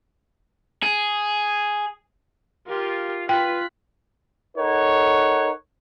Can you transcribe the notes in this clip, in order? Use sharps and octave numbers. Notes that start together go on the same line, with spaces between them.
G#4
F4 G4 A#4
F4 B4 G5 F#6 B6
D#4 A4 A#4 C#5 F#5